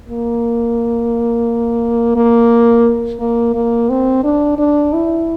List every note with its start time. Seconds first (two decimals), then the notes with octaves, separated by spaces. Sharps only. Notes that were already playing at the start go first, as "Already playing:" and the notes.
0.08 A#3
2.16 A#3
3.20 A#3
3.55 A#3
3.90 C4
4.24 D4
4.59 D4
4.93 E4